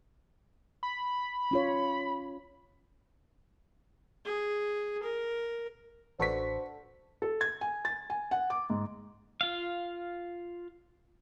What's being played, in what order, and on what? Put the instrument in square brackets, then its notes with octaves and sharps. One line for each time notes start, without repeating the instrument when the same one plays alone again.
[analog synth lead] B5
[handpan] C#4 F4 C#5
[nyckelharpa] G#4
A#4
[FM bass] A1 [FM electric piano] D4 F#4 A4 [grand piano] B4 C#6 B6 [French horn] C5
[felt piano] A4
G#6
G#5
A6
G#5
F#5
D6
G#2
[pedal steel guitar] F4 F5